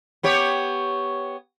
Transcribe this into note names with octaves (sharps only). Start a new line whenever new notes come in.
B3 G4 C#5